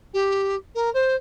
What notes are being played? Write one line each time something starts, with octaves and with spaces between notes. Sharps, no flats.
G4
A#4
C5